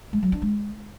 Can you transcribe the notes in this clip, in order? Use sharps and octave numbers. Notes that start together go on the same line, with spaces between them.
G#3
F#3
D4
G#3